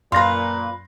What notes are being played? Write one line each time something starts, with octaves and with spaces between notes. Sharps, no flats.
F#2 A#2 B4 F5 C6 A#6